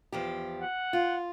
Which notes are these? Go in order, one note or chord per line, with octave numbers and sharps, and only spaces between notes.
E2 F3 G4
F#5
F4